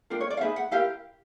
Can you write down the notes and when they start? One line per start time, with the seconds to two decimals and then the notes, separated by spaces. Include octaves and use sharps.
0.10 D4 F4 A#4 G5
0.21 C#5
0.30 D5
0.37 F5
0.41 D#4 G#4 B4 E5
0.56 F#5
0.71 E4 G4 A#4 F5